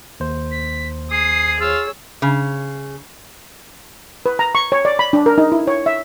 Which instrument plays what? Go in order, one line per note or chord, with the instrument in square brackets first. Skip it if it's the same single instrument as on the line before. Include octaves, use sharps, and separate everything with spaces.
[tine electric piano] D#2 C5
[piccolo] B6
[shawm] G#4 [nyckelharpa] D#6 [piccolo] C7
[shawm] F4 [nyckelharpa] G#4 C#5 [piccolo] E6
[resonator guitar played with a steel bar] C#3
[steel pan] B4
A#5
C#6
C#5
D5
B5
D4
A#4
D#4
E4
C#5
E5